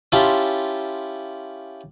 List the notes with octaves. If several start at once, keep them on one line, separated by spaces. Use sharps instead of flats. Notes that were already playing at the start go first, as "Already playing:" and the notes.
C#4 E4 F4 G4 A5 C6